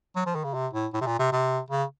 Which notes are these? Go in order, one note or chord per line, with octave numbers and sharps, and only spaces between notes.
F#3
F3
D#3
C#3
C3
A2
A2
C3
A#2
C3
C3
C#3